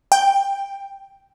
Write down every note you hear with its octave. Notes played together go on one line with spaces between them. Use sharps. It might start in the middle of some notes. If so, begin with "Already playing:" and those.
G5